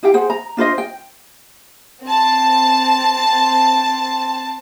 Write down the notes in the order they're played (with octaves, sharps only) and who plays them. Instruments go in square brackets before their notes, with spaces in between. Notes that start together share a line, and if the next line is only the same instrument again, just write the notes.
[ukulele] E4 G4 F5 G5
G#4 C5 F#5
A#5
D4 F4 C5 D#5
G5
[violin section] C4 A5